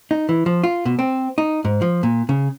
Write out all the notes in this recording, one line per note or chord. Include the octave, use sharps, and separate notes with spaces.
D#4
E3
F3
F4
B2
C4
D#4
G#2
F3
A#2
C#3